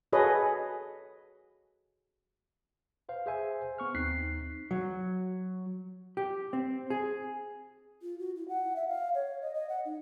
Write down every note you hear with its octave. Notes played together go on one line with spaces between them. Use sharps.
F#4 G#4 A4 B4 C#5 D#5
B4 C5 F5
G#4 C5 E5 G#5
B3 C#6 F6
D#2 C4 D#4 F#6 B6 C7
F#3
G4
C4
G#4
F4
F#4
E4
F#5
E5
F5
C#5
D#5
D#5
F#5
D#4